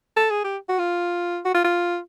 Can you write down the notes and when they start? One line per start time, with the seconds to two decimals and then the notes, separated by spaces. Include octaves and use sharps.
0.17 A4
0.31 G#4
0.44 G4
0.69 F#4
0.79 F4
1.45 F#4
1.54 F4
1.64 F4